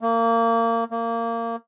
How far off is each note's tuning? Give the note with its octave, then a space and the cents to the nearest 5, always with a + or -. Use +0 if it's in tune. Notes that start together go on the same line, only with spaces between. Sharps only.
A#3 -25
A#3 -20